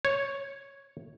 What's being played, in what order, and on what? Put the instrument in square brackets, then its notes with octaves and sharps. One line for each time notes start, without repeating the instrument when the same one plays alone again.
[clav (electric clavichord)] C#5